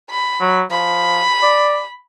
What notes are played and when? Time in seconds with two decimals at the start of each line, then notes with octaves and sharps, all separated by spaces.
0.10 B5
0.41 F#3
0.71 F3 B5
1.43 D5